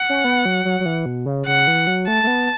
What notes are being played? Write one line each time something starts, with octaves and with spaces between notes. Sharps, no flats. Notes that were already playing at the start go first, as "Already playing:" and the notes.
Already playing: F#5
C#4
B3
F#3
F#3
F#3
E3
B2
C#3
C#3 F#5
E3
F#3
A3 A5
A3
B3